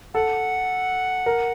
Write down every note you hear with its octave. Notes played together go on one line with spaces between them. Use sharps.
A4 F#5
A#4